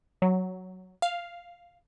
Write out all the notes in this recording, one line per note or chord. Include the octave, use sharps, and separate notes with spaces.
F#3
F5